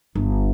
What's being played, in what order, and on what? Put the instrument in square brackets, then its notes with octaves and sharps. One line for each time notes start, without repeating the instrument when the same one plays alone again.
[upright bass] G1